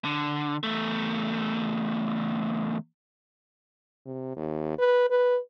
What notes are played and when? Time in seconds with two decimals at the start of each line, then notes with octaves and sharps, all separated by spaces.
0.05 D3
0.63 E2 A3
4.06 C3
4.36 D#2
4.78 B4
5.10 B4